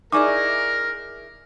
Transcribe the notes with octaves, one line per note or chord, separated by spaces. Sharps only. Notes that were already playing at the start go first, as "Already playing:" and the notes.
D#4 E4 G#4 A#4 D5 G#5 C#6 D6